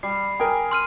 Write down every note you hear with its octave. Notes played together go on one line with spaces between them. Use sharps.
G3 C7
G#4 A#4 G5 G#5
C6 F6 D#7